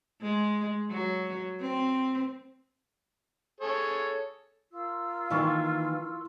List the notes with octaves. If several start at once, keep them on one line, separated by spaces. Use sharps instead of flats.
G#3
F#3
C4
G#4 A4 C#5
F4 A#4 E6
D#3 E3 A#3 E4 C6 C#6